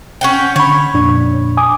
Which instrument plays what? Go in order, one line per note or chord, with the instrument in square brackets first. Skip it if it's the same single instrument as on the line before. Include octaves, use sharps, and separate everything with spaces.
[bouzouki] C#4 F#5 G5
[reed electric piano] D3 B5 [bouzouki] C#5
[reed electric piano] F2 A#2 D4
G#5 D6 D#6